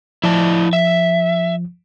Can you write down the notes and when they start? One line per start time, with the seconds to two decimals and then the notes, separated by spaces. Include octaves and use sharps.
0.23 F3 E4 D5 A5
0.73 E5